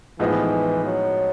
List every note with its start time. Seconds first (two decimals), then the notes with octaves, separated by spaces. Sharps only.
0.19 A2 E3 F3 G#3 B3 D#4
0.85 F#3